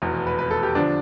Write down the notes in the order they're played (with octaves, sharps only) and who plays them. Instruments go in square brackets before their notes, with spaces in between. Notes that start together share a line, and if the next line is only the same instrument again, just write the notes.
[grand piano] F1 E2 B2
B4
B4
A4
G4
D3 F3 D4